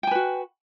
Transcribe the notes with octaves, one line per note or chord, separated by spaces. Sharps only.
F#4 B4 G5 G#5